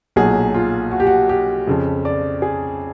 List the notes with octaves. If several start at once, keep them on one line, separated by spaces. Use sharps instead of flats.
B1 A#2 F#3 G#4
F4
F#4
G4
F#4
G4
F2 C#3 F3
D5
G#4